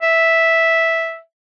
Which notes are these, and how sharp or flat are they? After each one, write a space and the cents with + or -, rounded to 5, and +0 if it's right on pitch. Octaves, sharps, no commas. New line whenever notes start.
E5 -5